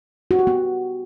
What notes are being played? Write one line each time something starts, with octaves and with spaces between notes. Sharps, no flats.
F#4
G4
B3